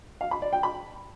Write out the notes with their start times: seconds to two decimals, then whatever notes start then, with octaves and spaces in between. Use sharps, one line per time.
0.21 F5
0.31 B5
0.42 D5
0.53 G5
0.63 B5